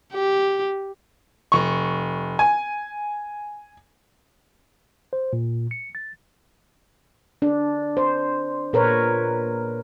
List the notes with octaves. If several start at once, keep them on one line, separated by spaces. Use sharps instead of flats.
G4
F1 C#6
G#5
C5
A#2
C#7
A6
D4
C5
A#2 A#4 B4 C#5